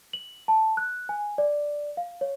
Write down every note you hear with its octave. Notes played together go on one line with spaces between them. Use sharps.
F#7
A5
F#6
G#5
D5
F5
C#5